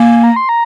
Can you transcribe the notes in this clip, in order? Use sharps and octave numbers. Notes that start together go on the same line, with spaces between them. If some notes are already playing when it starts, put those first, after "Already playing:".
Already playing: A#3 G#5
A#5
C6
A#5